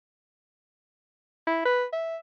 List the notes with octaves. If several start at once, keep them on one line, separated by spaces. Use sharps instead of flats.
E4
B4
E5